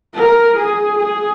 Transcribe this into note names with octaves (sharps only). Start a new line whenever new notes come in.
A#4
G#4
G#4